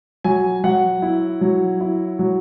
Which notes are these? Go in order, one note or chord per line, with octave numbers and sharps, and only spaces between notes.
F#3 G#5
F#3 F#5
E4
F#3
E4
F#3